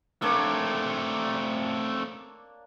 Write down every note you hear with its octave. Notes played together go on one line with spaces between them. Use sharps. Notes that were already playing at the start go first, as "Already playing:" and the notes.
A3 A#3 C4 D4 C#5